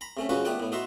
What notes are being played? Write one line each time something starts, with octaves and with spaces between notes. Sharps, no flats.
A#5 B5
C3 A3 C#4
C#2 F3 C#4 F#4 B4 C#6
A3 B3 D5 F#5 G5
A2 B3
D#4 F#4 E5 C6 C#6